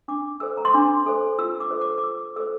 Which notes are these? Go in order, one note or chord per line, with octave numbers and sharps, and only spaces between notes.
D4 D6
A4 C5 E6
A#5
C6
D4 D6
A4 C5
F4 E6
D6
A4 C5
D6
D6
F4 E6
A4 C5 E6